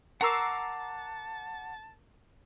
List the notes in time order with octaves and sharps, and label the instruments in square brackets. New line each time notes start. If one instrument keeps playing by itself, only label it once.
[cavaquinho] A#4 C#6 [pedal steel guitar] F#5 A#5 D6 [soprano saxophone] A5 [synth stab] E6 C7